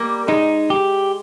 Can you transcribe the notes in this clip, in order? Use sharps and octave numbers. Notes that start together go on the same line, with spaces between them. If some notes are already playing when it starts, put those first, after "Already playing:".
Already playing: G3 A#3
G#3 D#4
G4